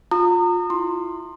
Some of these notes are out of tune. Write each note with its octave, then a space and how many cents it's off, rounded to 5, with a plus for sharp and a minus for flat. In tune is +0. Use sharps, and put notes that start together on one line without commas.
F4 +20 A#5 -35 D#6 -30
E4 +0 C6 +10